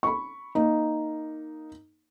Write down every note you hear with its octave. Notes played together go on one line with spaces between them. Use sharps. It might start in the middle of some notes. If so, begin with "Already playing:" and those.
B5 C#6
A#3 D#4